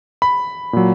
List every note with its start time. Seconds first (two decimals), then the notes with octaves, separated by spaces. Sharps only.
0.22 B5
0.73 A#2 F#3